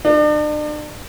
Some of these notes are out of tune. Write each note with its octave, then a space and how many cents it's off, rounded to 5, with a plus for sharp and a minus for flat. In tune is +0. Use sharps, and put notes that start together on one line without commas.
D4 +40